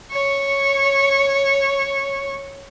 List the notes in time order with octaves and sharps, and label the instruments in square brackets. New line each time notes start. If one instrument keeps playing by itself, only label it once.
[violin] C#5 C#6